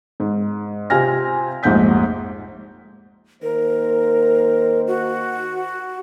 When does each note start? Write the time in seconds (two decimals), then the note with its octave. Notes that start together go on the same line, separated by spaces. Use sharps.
0.20 G#2
0.90 C3 C4 F4 G#5 F6 A#6
1.63 F1 A#1 G#2 F#5 G6 B6
3.43 D#3 A#3 A#4 C5
4.87 F#4